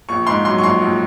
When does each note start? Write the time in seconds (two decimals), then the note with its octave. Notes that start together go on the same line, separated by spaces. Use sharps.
0.09 A#1 C#6
0.27 G#2 C6
0.45 F#3 C6
0.58 C#6
0.63 A#1 C6
0.82 A#1